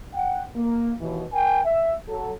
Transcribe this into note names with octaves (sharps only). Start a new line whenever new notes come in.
F#5 G5
A#3
D#2 B2 E3
A#4 G5 G#5
E5
F#3 A4